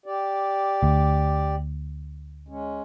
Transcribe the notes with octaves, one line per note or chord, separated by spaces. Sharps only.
G4 D5
D2
G#3 C#4